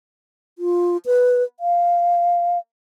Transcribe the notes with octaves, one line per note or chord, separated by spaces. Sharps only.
F4
B4
F5